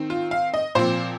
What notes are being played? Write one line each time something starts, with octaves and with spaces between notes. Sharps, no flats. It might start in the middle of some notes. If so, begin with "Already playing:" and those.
Already playing: D#3 C4
F4
F5
D#5
A#2 F3 C4 C5